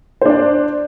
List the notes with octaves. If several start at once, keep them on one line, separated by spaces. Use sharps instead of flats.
D4 C5 D5